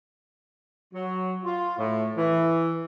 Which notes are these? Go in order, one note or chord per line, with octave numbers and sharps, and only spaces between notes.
F#3
F4
A2
E3